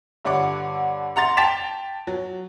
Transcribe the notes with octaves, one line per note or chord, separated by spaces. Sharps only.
G2 D3 C#5 F#5 D6
F#5 A#5 C6 A6
G5 A5 A6 B6 E7 F7
F#3